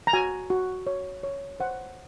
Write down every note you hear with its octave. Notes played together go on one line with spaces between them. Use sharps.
A#5
F#4 G#5
F#4
C#5
C#5
C5 F#5